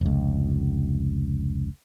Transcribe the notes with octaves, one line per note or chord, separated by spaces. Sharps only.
F1 C#2